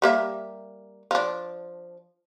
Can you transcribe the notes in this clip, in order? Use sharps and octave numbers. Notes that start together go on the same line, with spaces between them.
G3 A#3 E5
F3 D4